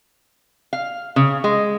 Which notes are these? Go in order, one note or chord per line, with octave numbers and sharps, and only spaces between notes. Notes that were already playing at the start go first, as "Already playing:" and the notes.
F5
C#3
G#3